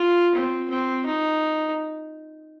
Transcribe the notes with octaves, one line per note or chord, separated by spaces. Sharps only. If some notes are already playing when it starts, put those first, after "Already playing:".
Already playing: F4
C4
C4
D#4